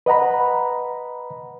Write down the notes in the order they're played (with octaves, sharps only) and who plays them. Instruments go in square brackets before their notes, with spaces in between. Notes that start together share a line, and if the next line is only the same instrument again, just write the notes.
[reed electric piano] B4 D#5 F#5 A#5 B5